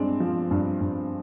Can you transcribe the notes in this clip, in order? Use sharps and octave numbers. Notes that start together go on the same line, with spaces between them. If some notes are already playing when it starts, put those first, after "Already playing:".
Already playing: G2 G#3 C4 D4
F3
G2
G2